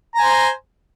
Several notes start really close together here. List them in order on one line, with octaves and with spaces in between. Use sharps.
A#5 G#5 C5